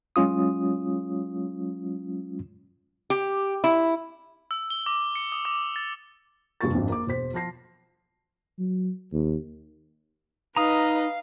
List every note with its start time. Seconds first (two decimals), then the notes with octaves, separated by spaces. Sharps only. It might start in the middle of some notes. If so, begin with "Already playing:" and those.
0.16 F#3 G#3 C#4 F4 D#6
3.10 G4
3.64 E4
4.51 E6
4.70 G7
4.86 D6
5.16 C#7
5.32 D#6
5.45 D6
5.76 A6
6.61 F1 G2 A#3 F4 C#6 A6
6.73 G#1 F2 D4
6.89 A#3 D6
7.07 E1 C5 B6
7.33 F3 F4 A5 A#6 C7
8.59 F#3
9.13 D#2
10.56 D#4 B4 D#5 F5 A#5 D#6